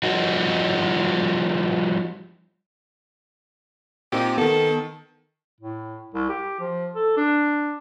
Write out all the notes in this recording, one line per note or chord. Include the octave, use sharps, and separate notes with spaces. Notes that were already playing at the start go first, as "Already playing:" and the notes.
F3 G3 D#4 F#4
A#2 C4 D#4 G4
D#3 B3 A4 A5
A2
C2
G4
F3
A4
D4